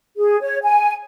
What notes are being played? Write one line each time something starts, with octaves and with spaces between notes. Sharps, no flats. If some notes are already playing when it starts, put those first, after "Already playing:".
G#4
C#5
G#5